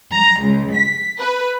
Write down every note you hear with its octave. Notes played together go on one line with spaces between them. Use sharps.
A#5
C#2
B6
B4